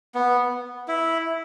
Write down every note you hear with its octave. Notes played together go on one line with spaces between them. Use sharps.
B3
E4